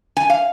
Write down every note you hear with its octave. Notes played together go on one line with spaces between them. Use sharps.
G#5
F5